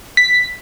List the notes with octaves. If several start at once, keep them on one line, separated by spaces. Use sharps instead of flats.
B6